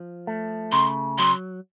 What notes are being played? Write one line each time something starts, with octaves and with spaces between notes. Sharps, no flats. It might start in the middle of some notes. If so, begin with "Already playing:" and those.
Already playing: F3
A3
C#3 C6
F#3 C6